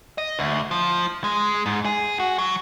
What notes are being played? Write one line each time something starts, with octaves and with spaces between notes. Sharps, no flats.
D#5
D2
F3
G#3
G#2
G#4
F#4
F#3